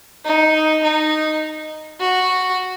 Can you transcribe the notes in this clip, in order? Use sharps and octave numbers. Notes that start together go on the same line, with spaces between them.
D#4
D#4
F#4